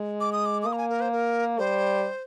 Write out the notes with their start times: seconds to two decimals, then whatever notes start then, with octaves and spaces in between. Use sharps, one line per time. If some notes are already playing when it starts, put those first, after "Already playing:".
Already playing: G#3
0.20 D6
0.32 D#6
0.46 D6
0.62 D6
0.66 A#3 D#6
0.73 A#5
0.78 G#5
0.90 A#4
1.01 C5
1.12 A#4
1.58 G3 C5